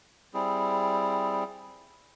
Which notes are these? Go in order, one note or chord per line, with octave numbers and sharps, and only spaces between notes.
G3 C4 E4 G#4